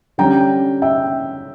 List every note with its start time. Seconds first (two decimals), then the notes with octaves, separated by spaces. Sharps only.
0.18 D3 G3 C#4 G5 A#5
0.82 E5 G5